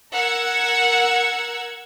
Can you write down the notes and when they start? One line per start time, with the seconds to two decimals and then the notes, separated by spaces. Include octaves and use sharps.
0.12 A#4 F#5 E6 G#6